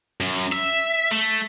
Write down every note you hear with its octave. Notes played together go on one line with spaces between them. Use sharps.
F#2
E5
A3